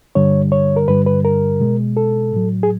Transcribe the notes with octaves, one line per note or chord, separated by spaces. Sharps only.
G2 D3 G3 C#5
C#5
A#4
G2 D3 G3 B4
B4
A#4
B2 G#3
A4
A2 F#3
G#4